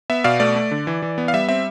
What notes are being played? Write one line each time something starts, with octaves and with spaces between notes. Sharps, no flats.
B3 E5
B2 D5 F5
A3 D5
A3
D3
E3
E3
B3
F5
G3 E5
C4 E5